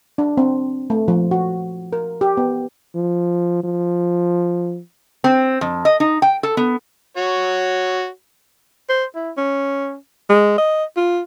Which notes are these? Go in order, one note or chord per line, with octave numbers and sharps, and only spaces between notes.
D4
C4
A3
F3
F#4
A#4
G4
B3
F3
F3
C4
F2
D#5
D#4
G5
A4
B3
F#4 C#5
C5
E4
C#4
G#3
D#5
F4